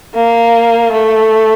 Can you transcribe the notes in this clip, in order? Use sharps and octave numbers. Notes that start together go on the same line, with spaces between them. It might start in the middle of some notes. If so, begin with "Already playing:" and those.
A#3
A3